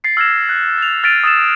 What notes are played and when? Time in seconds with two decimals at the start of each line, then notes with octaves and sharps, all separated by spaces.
0.04 A6 C7 C#7
0.17 E6 F6 G#6 A#6 E7
0.49 F#6
0.78 A6 F7
1.04 F6 A6 B6 D7 D#7 F7
1.24 D#6 E6 A6 E7